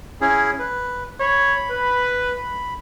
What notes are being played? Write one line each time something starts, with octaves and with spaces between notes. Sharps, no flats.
C#4 E4 G#4
B4
C#5 B5
B4